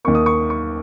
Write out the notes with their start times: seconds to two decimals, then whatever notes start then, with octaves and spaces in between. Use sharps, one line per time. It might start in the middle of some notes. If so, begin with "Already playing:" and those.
0.05 D#2 D#3 A#3 C#6
0.15 D#6
0.26 C#6
0.50 C#6